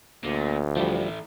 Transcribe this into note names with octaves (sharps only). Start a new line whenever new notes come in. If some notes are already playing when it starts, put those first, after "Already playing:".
D2 A#2
E3 F3 G3 A3